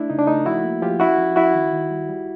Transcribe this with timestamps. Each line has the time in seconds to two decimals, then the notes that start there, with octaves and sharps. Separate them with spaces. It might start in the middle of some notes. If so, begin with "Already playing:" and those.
Already playing: A3 D4 E4
0.10 C#3 D#4
0.19 D4
0.27 A3 D#4
0.46 F3 E4 F#4
0.64 A#3
0.82 F3 F4 G4
1.00 C#4 E4 F#4
1.18 F3
1.36 F3 E4 F#4
1.54 D#3
1.73 D#3
1.91 G3
2.09 G3